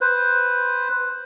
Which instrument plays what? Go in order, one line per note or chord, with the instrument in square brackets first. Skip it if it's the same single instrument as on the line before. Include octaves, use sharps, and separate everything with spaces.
[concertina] B4 C5